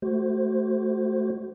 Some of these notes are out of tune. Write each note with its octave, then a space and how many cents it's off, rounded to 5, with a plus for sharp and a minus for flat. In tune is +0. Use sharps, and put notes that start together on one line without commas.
A3 -10 F#4 +20 C5 +0